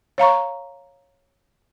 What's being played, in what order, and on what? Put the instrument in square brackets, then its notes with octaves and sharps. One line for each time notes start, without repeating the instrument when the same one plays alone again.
[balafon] C#5 F5 A#5 C#6